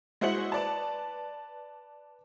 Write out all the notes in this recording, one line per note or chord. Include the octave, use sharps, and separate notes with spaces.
G#3 E4 F#4 C5 C#7 F#7
B4 D5 A5